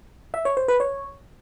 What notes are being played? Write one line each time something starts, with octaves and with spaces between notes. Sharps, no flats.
E5
C#5
C5
B4
C#5